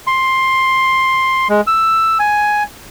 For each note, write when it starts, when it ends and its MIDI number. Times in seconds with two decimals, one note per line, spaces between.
0.07 1.48 84
1.49 1.61 56
1.67 2.18 88
2.19 2.63 80